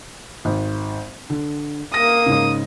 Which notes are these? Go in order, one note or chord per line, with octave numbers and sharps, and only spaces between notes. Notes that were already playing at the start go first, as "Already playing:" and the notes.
G#1
D3
A#3 D#6 A#6
G#2 C#3